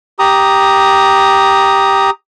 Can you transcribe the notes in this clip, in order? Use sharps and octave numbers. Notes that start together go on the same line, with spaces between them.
G4 A#5 D#6